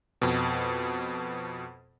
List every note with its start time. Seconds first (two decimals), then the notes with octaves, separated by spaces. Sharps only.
0.22 F2 B2